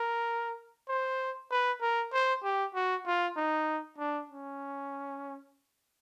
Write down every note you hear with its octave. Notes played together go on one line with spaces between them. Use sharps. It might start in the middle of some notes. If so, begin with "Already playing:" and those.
Already playing: A#4
C5
B4
A#4
C5
G4
F#4
F4
D#4
D4
C#4